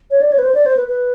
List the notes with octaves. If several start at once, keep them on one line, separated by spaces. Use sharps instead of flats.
C#5
D5
C#5
B4
C5
D5
C5
B4
B4